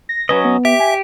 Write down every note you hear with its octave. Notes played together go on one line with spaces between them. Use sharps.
A#6
F#3 C#4 B4 D#5
B3
G4 E5
G#5